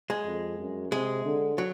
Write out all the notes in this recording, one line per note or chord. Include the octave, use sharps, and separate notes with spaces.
G#3
F2
F#2
C3 G#3
D3
F#3